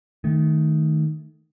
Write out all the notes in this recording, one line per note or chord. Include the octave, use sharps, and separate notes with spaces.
D#3 A3